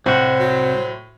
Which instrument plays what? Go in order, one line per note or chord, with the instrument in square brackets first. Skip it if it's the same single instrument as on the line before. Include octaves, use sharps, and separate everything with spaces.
[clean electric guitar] C2 F#4 [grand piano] A2 [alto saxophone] C5
[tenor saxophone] F#3